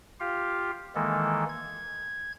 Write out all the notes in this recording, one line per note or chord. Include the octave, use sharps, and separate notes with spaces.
F4 G4 F5
D#3 E3 G#3 A#3 A4
G#6